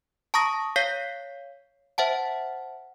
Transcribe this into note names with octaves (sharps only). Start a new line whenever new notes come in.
A5 A#5 C#6 D#6 A#6
C#5 F5 G6 B6 C7
C5 E5 F#5 A5